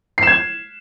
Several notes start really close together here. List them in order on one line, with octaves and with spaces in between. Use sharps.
C7 E7 G#6